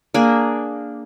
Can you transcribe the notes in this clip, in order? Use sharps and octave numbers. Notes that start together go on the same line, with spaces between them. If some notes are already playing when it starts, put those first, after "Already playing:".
A#3 D4 G#4